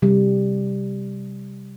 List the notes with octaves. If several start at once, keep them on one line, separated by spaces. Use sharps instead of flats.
C3 G3